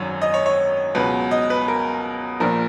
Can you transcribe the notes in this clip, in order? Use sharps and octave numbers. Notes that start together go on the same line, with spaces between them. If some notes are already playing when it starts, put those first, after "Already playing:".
Already playing: G#1 F#2 D#3 F#3 C#5
D#5
C#5
C#5
C#2 B2 F#3 B4
D#5
B4
A#4
A#1 A#2 F3 A#4